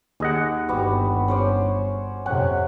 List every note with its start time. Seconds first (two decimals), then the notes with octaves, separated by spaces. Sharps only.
0.20 D#2 G#4 D#5 F#5
0.68 G1 G3 B3 F#4
1.28 C#4 C5 D5
2.26 F2 C3 C#4 F#5